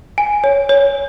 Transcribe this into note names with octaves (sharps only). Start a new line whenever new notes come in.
G#5
C#5
C#5